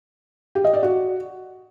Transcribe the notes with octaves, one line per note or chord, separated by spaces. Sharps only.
G4
D#5
D5
F#4